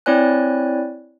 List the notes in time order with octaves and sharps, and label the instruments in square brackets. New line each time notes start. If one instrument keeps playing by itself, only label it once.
[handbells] C4 E4 C#5 D5 G#5 F#6